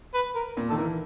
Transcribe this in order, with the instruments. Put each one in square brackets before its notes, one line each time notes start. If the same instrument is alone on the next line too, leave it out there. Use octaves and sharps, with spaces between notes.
[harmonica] B4
A#4
[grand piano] A#2
[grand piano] D#3 [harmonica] A4
[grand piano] E3 [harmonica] A#4